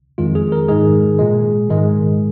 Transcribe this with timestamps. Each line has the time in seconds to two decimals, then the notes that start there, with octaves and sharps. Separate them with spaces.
0.18 F2 D#3 G#3 F4
0.35 G#4
0.52 A#4
0.68 G#2 D#3 G#3 G#4
1.19 A#2 G#3
1.69 G#2 D#3 G#3